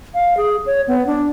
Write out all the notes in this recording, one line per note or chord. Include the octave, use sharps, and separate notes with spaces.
F5
G#4
C#5
B3
D4